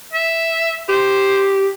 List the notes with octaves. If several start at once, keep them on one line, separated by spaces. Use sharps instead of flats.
E5
G4 C5